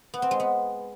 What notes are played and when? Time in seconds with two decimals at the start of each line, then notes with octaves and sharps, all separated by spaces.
0.14 B3
0.22 C4
0.31 G#3
0.40 B3